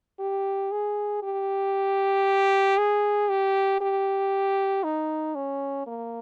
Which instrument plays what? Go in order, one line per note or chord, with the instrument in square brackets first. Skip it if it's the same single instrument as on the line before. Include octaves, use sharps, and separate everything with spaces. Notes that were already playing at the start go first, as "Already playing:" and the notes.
[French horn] G4
G#4
G4
G#4
G4
G4
D#4
C#4
A#3